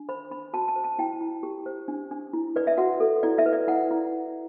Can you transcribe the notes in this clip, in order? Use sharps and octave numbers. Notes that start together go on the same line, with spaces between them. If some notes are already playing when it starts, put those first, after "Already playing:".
Already playing: D4
C5 B5
D4 B5
F#4 A5
A5
C5
A5
E4 G5
E4
G4
C5
D4
D4
E4
B4 D5
E5
F#4 F#5
A4
E4 D5
E5
B4
D5
E4 F#5
E4